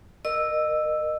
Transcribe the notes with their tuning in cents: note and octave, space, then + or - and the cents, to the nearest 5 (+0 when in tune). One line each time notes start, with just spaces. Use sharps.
A#4 +0 D#5 -25 E6 +0